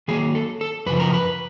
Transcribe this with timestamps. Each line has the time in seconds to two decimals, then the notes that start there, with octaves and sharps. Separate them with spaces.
0.08 D#3 F#3 A#3 G#4
0.35 A4
0.61 A4
0.86 F#2 C#3 F3 B4
1.00 A#4
1.14 B4